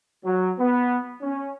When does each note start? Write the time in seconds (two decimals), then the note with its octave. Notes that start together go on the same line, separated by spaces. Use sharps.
0.24 F#3
0.59 B3
1.22 C#4